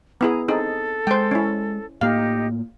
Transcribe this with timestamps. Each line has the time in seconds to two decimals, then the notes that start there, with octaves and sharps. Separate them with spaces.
0.21 B3 E4 G#4 G#5 A#5
0.48 C4 D#4 G#4 A4
1.07 G#3 C5 G5
1.31 C#4 E4
2.01 A2 A#3 D#4 G4 D#5 F5